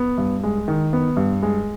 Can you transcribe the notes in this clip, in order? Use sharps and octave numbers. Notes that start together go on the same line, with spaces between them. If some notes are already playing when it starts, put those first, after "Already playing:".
Already playing: B3
G2
G#3
D#3
B3
G2
G#3